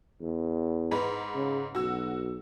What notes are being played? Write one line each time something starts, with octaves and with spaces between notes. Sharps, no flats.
E2
G#2 B4
C#3
B1 F#4 E6